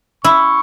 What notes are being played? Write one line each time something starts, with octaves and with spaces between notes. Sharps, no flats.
E4 C#6